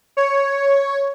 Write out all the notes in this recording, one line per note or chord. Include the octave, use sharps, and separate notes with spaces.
C#5